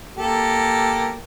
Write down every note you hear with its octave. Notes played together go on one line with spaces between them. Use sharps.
A#3 G4 A4